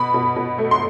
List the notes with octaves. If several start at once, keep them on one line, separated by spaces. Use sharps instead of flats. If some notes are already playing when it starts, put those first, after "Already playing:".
Already playing: B2 B5
B2
B2
A3
C6